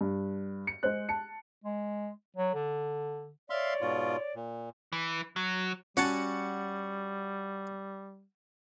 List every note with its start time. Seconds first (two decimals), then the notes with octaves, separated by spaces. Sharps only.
0.01 G2
0.67 C#7
0.83 G#3 G#4 C5 F#6
1.09 A5 C#7
1.64 G#3
2.36 F#3
2.55 D3
3.50 C#5 D5 E5 F5 C6
3.81 G#2 B2 F4
4.35 A#2
4.93 E3
5.36 F#3
5.97 G3 C#4 F#4 F#5 A5